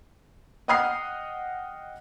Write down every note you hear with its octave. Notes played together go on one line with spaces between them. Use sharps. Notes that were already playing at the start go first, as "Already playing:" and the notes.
D#5 F#5 G5 D#6 F6 C7